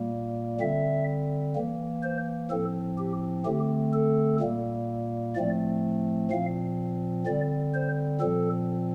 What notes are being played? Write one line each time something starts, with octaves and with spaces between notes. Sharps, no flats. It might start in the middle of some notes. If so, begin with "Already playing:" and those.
Already playing: A#2 G3 A#3
D3 G3 C4 E5
E3 A#3
C5
A2 F3 C4 A4
G4
D3 A3 C4 G4
A4
A#2 G3 A#3
A2 F3 A3 C4 D5
A#2 F3 C4 F5
D3 G3 C4 D5
C5
A#2 F3 C4 A4